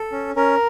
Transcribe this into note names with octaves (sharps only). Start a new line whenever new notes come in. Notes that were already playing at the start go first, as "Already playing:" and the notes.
Already playing: A4
C#4
C#4 A#4